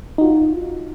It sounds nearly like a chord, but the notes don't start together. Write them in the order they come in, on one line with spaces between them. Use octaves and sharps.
D#4 F#4 F4